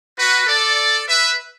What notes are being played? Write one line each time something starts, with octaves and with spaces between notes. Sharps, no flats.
F#4 B4
A4 D5
B4 E5